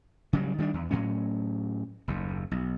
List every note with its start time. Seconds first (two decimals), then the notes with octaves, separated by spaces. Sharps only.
0.33 C#3 F#3 G3
0.58 D#3 G3 C#4 D4
0.74 E2
0.91 A2 F#3 C#4
2.08 F#1 D#2
2.51 B1